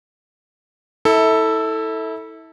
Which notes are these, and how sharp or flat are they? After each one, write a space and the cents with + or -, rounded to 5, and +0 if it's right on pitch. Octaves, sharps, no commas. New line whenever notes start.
E4 -30 A4 +5 E5 -25